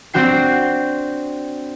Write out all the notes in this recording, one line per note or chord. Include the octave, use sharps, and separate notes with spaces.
C4 D4 F#4 G5 C7